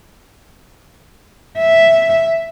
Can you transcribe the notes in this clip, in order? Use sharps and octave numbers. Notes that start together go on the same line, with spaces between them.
E5